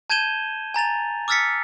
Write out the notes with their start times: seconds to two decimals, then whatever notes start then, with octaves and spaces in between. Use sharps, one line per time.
0.10 A5 G6 G#6 D#7 E7 G7
0.74 G#5 A#5 A6 F7
1.28 D6 E6 F6 A6 B6 C#7